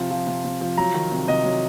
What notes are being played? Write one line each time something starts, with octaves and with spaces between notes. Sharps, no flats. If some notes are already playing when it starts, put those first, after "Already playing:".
Already playing: C3 F3
F3
C3
C3
F3
F#3 A#5
D#3
C3
C3 D#5
F#3